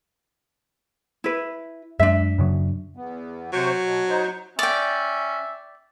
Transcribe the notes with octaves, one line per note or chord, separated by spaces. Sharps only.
E4 B4
F#2 G#3 D4 E5
F#2 C#3 F#3
E2 B3
C3 F#3 C5 C#6
B2
D#4 C5
C#4 D5 E5 G5